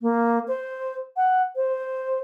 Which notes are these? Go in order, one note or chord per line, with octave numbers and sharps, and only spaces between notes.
A#3
C5
F#5
C5